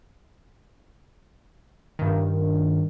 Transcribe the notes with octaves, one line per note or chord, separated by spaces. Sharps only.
G2 D#3